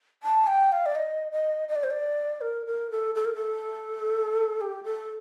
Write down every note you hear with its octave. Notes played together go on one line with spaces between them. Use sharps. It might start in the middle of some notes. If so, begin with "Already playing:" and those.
A5
G5
F5
D5
D#5
D#5
D#5
D5
C5
D5
A#4
A#4
A4
A4
A#4
A4
G4
A4